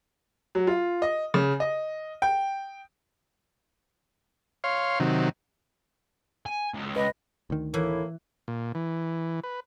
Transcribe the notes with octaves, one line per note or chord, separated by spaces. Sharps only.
F#3
F4
D#5
C#3
D#5
G5
C#5 F5 C6
C3 D#3 F#3
G#5
C#2
B4 D#5
D2 D#3
A2 E3 A#3 E4
A#2
E3
B4